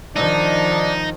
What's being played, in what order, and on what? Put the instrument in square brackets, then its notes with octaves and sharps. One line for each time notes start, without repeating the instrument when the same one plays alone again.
[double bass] D#3 F3 [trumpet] D4 [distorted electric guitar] D#4